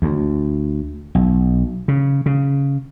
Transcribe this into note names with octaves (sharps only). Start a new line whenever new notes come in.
D2
B1
C#3
C#3